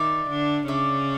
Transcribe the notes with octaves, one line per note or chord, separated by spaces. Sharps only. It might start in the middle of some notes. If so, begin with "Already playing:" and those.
Already playing: D#3 D#4 D5 E5
D3 D4
C#3 C#4 D5 E5